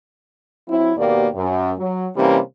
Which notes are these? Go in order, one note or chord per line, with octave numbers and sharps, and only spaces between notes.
F#3 C4 E4
D#2 B2 A#3 G4 D5
F#2
F#3
C3 E3 G3 A#3 C#4